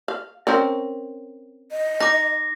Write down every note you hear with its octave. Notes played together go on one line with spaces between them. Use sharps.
F5
C4 C#4 A#4
D#5
D#4 D6 A#6